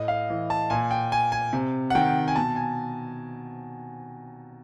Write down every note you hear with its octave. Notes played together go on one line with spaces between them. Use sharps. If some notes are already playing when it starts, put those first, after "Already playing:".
Already playing: A2 D#5
F5
E3
A5
A#2 G#5
G5
G#5
G#5
C3
F#5
D#3 G5
G#5
B2 A5
G#5